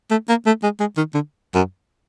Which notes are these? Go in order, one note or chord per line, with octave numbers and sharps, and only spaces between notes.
A3
A#3
A3
G#3
G#3
D#3
D3
F#2